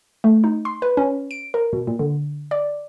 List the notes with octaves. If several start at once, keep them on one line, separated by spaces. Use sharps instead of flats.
A3
D#4
C6
B4
C#4
D7
A#4
B2
A#2
D3
D5